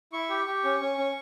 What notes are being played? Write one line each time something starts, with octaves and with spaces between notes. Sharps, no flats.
E4 C#6
G4
G4
C#4
C#4
C#4